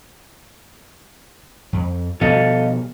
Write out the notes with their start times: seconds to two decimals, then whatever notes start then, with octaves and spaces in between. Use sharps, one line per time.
1.73 F2
2.21 B2 F3 G3 A4 D#5 F5